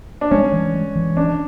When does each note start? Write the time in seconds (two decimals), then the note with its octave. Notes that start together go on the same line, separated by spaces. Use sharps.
0.21 D4
0.31 G#3 C#4
0.52 E3
0.74 G#3
0.95 E3
1.17 C#4 D4